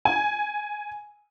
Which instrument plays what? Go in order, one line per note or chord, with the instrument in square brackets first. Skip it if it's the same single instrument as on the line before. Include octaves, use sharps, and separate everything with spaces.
[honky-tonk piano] G#5